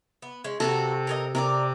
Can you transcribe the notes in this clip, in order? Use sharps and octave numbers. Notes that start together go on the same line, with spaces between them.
B3
G#3 C#4
C3 F#3 A#3 F#4 A4
A#4 C#5 D#5
C3 A#4 C#5 D5